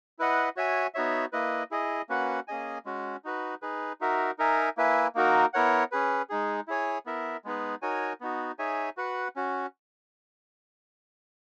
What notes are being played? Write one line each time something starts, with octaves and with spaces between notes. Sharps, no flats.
E4 B4 D#5 F#5
F#4 C#5 E5 G#5
B3 D#4 F#4 C#5 E5
A#3 E4 B4 D#5
E4 G#4 D#5
A#3 C#4 F#4 B4 F#5
A#3 C#4 G#4 D#5 G#5
G#3 C#4 F#4
D#4 F#4 B4
D#4 G#4 B4
D#4 F#4 A#4 E5
D#4 A#4 E5 G#5
A#3 E4 B4 E5 G#5
A#3 D#4 F#4 A#4
B3 E4 A#4 C#5 F#5
C#4 G#4 B4
G#3 D#4 G#4
E4 G#4 C#5 G#5
B3 E4 A#4 E5
G#3 B3 D#4 G#4 B4
D#4 F#4 A#4 C#5 G#5
B3 D#4 F#4
D#4 G#4 C#5 E5 G#5
F#4 B4 F#5
C#4 F#4